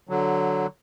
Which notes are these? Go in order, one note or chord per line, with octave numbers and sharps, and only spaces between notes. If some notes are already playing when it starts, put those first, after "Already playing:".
D3 F#3